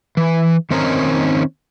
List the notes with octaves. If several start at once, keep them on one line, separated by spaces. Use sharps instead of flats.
E3
D#3 C4 C#4 D#4 A#4